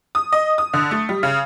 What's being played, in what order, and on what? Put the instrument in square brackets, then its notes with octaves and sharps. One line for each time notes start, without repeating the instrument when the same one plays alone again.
[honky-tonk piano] D#6
D#5
D#6
D3
A3
G3
C#3